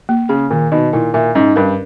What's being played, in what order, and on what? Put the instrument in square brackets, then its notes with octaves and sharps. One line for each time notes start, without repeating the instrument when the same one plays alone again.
[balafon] A#3
[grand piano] C#3 [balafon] G#4
[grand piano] A#2 [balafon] D#3
[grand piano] B2 [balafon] D#4
[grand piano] A#2 [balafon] E4
[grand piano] A#2 [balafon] E5
[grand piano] G#2 [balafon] C#4
[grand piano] G2 [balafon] A#4